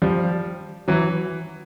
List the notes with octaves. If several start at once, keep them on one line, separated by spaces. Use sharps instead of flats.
F3 G3
E3 F#3